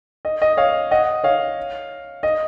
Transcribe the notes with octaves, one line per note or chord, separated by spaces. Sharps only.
D#5
D#5
C#5 F5
D#5 F#5
C#5 F5
D#5